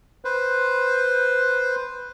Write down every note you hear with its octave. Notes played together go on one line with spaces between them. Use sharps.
B4 C5